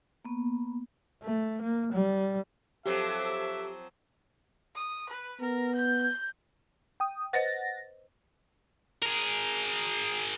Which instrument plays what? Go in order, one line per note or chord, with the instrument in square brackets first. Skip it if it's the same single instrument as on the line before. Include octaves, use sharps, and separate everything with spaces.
[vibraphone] A#3 B3
[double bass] A3
A#3
G3
[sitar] F3 F#3 C4 [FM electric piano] G4 [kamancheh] A4 D6 [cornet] E5
[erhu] D#6
B4
[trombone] B3 [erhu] A#4
[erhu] G6
[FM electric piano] G5 D#6
[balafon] B4 C5 D#5 [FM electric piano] F#5 A6 A#6
[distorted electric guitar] G#4 A#4